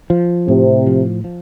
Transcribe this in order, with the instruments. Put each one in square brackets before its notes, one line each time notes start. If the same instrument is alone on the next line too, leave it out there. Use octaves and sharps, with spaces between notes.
[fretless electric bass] F3
[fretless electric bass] A2 [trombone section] C3
[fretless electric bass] F3
F3